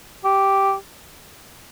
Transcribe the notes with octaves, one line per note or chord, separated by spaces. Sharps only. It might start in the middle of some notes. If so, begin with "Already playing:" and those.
G4